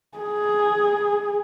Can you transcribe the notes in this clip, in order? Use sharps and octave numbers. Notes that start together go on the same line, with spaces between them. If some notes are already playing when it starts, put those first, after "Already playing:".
G#4